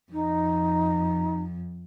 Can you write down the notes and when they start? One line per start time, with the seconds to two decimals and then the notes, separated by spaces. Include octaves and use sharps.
0.12 F2 D#4